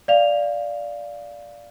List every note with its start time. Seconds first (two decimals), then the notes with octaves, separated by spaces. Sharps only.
0.08 D5 F5 F7